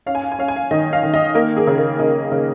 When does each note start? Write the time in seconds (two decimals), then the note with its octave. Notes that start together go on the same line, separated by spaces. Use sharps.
0.06 C#4 F5
0.15 G#5
0.23 F5
0.32 G#5
0.39 C#4 F5
0.48 G#5
0.56 F5
0.71 D#3 D#5
0.93 F5
1.03 D#3
1.14 D#5
1.35 A#3 A#4
1.57 G#4
1.67 C#3
1.78 A#4
1.99 C#3 D#5
2.32 C#3